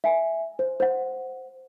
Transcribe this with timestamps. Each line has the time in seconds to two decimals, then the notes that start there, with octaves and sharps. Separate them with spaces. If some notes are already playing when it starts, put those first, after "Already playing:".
0.04 E5 G#5
0.59 C5
0.80 C5 F#5